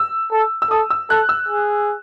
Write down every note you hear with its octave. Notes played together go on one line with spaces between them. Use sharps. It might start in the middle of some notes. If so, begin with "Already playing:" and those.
Already playing: E6
A4
E6
A4 D#6
E6
A4 F#6
E6
G#4